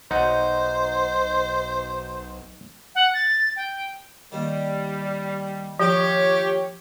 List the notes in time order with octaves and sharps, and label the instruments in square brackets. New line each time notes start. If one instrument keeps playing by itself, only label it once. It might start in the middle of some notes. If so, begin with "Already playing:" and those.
[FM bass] B1 [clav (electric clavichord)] D#4 F#5 [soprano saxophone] C5
[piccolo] F#5
A6
G5
[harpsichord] D#2 D#3 [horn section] G3
[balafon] F3 [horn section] F4 C#5 [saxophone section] G4